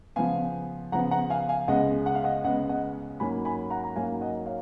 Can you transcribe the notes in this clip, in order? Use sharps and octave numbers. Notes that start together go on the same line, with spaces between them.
C#3 F3 B3 F5 G#5
C#3 F3 B3 F#5 A#5
F#5 A#5
F5 G#5
F5 G#5
C#2 C#3 G#3 B3 D#5 F#5
F#5
F5
D#5 F#5
C#2 C#3 G#3 B3 D#5 F#5
D#5 F#5
G#2 F#3 A#3 C#4 G#5 B5
G#5 B5
F#5 A#5
A#5
G#2 F#3 A#3 C#4 F5 G#5
D#5 F#5
C#5 F5